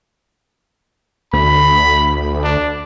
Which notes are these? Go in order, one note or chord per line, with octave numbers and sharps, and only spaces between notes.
D2 B5
D4